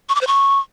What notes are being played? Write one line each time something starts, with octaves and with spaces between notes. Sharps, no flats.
C#6
D6
C5
C#6